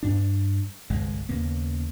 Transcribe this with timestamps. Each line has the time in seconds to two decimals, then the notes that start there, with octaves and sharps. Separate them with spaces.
0.03 G2 D4
0.90 G1 C2 G#3
1.29 D#2 C#3 A#3 B3